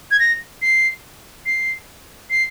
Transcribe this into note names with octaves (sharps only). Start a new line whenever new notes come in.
G#6
A#6
C7
C7
C7